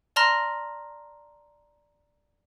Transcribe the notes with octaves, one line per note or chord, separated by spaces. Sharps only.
D5 A5 A#5 C6 F6 A#6